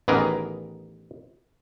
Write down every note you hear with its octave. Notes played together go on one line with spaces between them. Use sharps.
A1 D#3 E3 B3 G#4 A#4